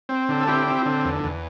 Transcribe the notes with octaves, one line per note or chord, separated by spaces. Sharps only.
C4
D3
A4
C4 E4 G4
C4
D3
E2
E2